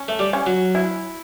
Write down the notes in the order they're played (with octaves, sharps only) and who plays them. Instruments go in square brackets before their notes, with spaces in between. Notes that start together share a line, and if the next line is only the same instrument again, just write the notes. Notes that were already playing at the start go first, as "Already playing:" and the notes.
Already playing: [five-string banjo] C#4
[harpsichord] A3
G3
[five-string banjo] C#4
[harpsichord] F#3
[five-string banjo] E4